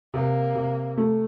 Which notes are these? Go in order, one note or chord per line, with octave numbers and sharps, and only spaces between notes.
C3 A#3
C3
A3